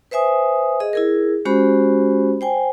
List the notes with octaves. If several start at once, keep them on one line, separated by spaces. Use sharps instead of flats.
B4 C5 E5 G#5 D#6
G#4 D#5
E4 G#4 A#4
G#3 C#4 F#4 G4 C5 B5
C5 G5 G#5